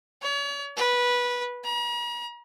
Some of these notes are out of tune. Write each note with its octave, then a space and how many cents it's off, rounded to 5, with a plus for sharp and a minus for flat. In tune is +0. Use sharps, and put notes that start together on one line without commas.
C#5 +40
B4 -15
A#5 +45